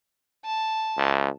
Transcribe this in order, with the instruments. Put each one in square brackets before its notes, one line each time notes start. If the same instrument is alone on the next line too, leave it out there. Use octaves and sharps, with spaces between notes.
[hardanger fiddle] A5
[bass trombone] C#2